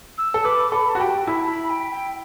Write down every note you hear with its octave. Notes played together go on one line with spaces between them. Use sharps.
E6
A4
B4 D6
A4 B5
A5
F#4
G4 G5
E4 B5
A5
B5
G5
G5